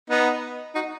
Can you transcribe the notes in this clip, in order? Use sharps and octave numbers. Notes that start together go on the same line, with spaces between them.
B3 D#4
D#4 F#4